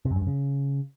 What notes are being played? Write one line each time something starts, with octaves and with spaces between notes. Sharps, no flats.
C3
F#2
G2
F#2
C#3